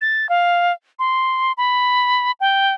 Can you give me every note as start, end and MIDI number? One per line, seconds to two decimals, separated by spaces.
0.01 0.29 93
0.29 0.72 77
0.99 1.52 84
1.57 2.31 83
2.40 2.74 79